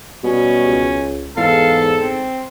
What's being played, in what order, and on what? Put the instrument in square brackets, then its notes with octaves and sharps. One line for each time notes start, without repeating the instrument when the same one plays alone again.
[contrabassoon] B2 [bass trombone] G3 [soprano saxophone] C#4
[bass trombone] C#2
[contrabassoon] E2 [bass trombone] G#2 [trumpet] A4 [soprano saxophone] F5
[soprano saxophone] C4